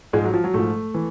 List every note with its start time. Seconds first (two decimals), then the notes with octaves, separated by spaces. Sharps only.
0.13 G#2 F3 G#3
0.24 F#3
0.34 F3
0.44 F#3
0.54 G#2 F3 A3
0.95 E3